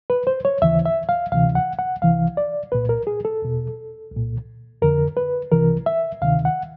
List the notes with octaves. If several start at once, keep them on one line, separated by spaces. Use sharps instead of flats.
B4
C5
C#5
D#2 C#3 E3 E5
E5
F5
D2 C3 E3 F5
F#5
F#5
C2 C3 E3 F5
D5
C2 A#2 B4
A#4
G#4
A4
E2 B2
C2 A#2
F2 D3 A#4
B4
C2 C3 E3 A#4
E5
D2 C3 D#3 F5
F#5